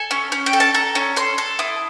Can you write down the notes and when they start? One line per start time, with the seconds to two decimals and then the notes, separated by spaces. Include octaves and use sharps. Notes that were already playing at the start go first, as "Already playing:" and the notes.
Already playing: A4 G#5
0.11 C#4
0.32 C#4
0.46 G5
0.53 A4
0.60 A5
0.74 A4 A#5
0.95 C#4
1.16 A4 C6
1.38 A4
1.59 E4 D#6